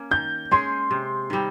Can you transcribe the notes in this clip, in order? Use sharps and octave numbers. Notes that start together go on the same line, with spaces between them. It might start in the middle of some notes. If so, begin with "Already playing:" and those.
Already playing: A#3 C#4
D#3 G6
G#3 C#4 G#4 C6
C3
D#3 G3 C4